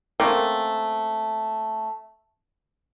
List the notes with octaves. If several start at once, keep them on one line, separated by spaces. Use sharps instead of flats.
A3 A#3 C4 C#4